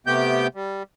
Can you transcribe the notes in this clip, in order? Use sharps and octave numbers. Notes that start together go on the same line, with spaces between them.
C3 A3 B3 G4 G5 G6
G3